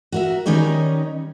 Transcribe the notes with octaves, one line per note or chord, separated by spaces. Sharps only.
F#4 A#4 E5
D#3 G3 C#4 D#4 A#4 C#5